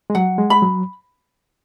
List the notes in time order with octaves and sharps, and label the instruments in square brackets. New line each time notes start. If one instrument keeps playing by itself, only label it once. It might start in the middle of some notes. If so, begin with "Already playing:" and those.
[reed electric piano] G#3
[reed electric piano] F#3 [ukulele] F#5
[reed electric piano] G#3
[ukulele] B5
[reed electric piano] F#3